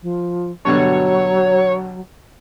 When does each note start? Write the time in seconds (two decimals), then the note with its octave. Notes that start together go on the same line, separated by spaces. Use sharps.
0.02 F3
0.65 G2 B2 D3 F#3 C#5